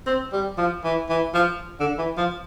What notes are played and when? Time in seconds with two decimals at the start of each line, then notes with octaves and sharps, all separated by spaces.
0.07 C4
0.32 G3
0.58 F3
0.84 E3
1.09 E3
1.34 F3
1.80 D3
1.98 E3
2.18 F3